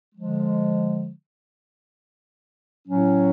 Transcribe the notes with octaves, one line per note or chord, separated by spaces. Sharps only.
D3 F3 G#3
A2 F#3 C#4